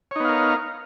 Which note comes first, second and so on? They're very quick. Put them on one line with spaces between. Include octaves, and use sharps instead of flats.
C#5 D#4 B3 F5 A#4